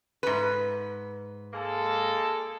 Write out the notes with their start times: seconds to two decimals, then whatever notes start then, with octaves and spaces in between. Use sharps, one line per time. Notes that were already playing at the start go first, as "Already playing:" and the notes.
0.23 G#2 B4
1.53 G#3 A#3 A4